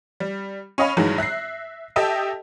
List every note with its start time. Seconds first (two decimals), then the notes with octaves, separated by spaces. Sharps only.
0.20 G3
0.78 C#4 C#5 D#5 F5 B5
0.97 G2 D#3 E3 F#3 G#3
1.18 E5 F#6 A#6 C7
1.96 G4 A4 D#5 E5 G5 A5